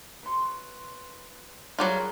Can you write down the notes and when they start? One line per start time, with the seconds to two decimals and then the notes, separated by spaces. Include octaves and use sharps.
0.23 B4 C#5 C6
1.79 F#3 G3 F4 G#4 A#4 F#5